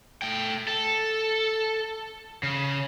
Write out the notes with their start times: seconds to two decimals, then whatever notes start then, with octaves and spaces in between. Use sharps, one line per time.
0.22 A3 G5
0.68 A4
2.43 C#3